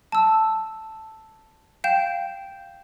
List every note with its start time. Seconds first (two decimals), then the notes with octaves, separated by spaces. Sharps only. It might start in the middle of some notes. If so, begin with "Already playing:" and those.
0.12 A5 E6
1.84 F5 G5 G6 E7